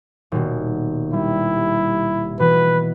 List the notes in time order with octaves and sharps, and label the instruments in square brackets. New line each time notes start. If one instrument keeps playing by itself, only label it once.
[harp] D#1 B2
[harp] G3 [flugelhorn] E4
[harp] B2 E3 [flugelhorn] B4